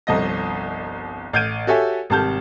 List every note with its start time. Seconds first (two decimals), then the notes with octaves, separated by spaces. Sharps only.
0.07 G1 C2 F3 D#5 A#6
1.33 A1 F6 G6 G#6 D7 D#7
1.67 F#4 G4 A4 C#5 E5 G#5
2.10 G#1 C3 G3 A5 F6 G6